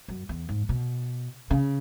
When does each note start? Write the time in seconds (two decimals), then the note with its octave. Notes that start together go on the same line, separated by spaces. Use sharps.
0.08 F#2
0.29 E2
0.49 G#2
0.69 B2
1.51 C#3